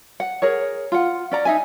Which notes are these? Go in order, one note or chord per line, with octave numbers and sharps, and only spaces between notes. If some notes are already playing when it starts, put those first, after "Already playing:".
F#5
G#4 A#4 C#5
F4 F#5
C#4 D5 A#5
D#4 E5 G#5